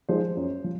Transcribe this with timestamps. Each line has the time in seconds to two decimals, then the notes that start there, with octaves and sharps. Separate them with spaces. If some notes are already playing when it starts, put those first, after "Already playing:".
0.09 F3 G#3 D#4 C5
0.37 F#2
0.64 F3